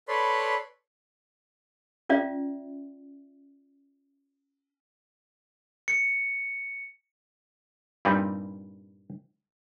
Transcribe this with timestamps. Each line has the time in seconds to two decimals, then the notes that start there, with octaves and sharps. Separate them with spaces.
0.08 A4 B4 C#5 D5 B5 C6
2.09 C#4 F4 D5 E5
5.88 C#7
8.05 G2 A#2 G3 C4 D#4